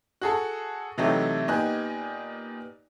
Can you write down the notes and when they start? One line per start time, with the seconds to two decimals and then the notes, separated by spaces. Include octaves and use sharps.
0.21 F#4 G#4 A4
0.98 C3 E3 F#3 A3 D#4 G4
1.48 A#2 B3 D#4 G4 G#5 F#6